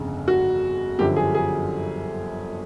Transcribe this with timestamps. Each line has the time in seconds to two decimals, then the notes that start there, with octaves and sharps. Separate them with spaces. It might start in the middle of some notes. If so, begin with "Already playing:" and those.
Already playing: G1 F2 C#3
0.28 F#4
0.99 G1 F#2 D3 F3 G4
1.16 G#4
1.35 G#4